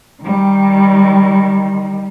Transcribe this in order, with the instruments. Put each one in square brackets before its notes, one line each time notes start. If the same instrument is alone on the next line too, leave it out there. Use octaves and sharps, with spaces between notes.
[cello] D#3 G3